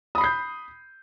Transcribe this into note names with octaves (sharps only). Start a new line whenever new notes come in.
B5 D#6 G6 C7